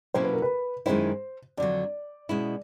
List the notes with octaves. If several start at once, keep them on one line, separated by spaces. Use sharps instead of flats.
B2 F#3 A#3 C#4 E4 C5
B4
A#4
B4
F#2 D#3 G#3 C#4 E4 C5
F2 D3 F#3 D5
B2 G#3 C#4 E4